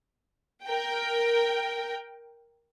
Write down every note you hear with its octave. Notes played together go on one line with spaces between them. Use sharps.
A#4 G5